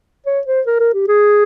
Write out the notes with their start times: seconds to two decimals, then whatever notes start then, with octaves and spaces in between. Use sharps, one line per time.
0.26 C#5
0.47 C5
0.66 A#4
0.80 A#4
0.94 G4
1.08 G#4